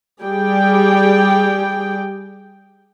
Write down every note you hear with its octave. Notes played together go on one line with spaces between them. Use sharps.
G3 G4 G#4 G5